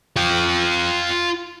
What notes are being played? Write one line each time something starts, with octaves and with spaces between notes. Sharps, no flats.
F4 G5